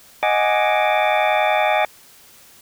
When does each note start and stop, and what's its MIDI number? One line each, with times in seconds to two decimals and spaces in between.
0.23 1.85 75
0.23 1.85 78
0.23 1.85 80
0.23 1.85 86